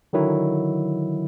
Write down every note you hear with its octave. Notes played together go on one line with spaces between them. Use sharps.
D3 D#3 F#3 E4